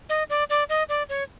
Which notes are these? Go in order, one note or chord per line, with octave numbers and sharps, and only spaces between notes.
D#5
D5
D5
D#5
D5
C#5